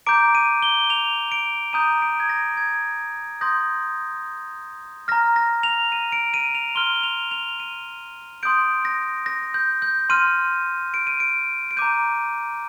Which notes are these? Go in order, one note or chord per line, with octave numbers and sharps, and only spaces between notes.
A#5 D6 G6 D7
D#7
G7
F7
D7
A#5 D#6 G6 D#7
D7
G#6
A#6
G#6
C6 D#6 G6 A#6
A#5 F6 A#6
A#6
F7
D#7
D7
D#7
F7
C6 F6 G7
F7
F7
D#7
C6 D#6 G6 D7
A#6
A#6
G6
G6
C6 F6 D#7
D7
D#7
D7
D7
A#5 D6 G6 D#7